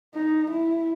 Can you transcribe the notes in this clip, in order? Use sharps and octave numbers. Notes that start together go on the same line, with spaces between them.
D#4
E4